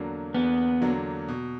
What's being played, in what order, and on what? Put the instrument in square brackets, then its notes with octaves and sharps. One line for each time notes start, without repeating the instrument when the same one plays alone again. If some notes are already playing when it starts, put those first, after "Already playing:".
Already playing: [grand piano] E2 D3 F#3 A#3 D4
[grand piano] E2 [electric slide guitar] B3
[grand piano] D3 F#3 A#3 D4
B2